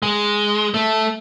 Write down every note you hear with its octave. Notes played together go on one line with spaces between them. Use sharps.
G#3
A3